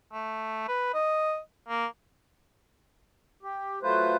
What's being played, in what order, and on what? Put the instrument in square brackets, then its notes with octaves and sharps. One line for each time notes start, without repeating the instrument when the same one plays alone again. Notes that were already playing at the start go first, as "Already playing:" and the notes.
[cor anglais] A3
B4
D#5
A#3
[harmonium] G4
F#3 A3 F4 B4 C5